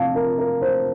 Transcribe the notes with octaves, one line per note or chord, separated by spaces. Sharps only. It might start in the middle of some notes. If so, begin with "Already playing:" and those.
Already playing: C3 F3 F5 A5
A#4
A#4
C5